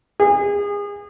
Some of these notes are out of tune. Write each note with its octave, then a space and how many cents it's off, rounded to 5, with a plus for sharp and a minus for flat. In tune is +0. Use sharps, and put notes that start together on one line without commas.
G#4 -30